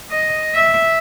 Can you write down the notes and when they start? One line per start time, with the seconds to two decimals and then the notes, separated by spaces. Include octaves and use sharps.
0.11 D#5
0.55 E5